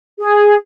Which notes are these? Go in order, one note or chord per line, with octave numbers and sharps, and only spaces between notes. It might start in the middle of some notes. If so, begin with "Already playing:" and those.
G#4